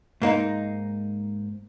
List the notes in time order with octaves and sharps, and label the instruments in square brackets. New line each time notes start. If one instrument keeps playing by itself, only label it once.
[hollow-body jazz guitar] G#2 A#3 D#4